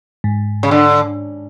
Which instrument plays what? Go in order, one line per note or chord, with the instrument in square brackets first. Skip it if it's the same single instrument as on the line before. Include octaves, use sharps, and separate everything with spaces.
[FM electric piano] G#2
[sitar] C#3
D3